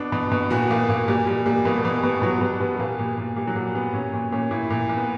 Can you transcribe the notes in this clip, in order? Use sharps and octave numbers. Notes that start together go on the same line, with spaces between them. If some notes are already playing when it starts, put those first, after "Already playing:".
Already playing: B2 D4
B2
B2
A#2 F#4
A#2 A#3
A#2 A#3
A#2 G3
A#2 G3
A#2 G3
B2 A#3
G3
B2 A#3
B2
B2 F#3
B2 G3
B2 B3
G3
A#2 A#3
A#2
A#2
A#2 G3
F#3
A#2 G3
A#2 B3
A#2 C#4
A#2
A#2 C#4
A#2 E4
A#2
A#2
B3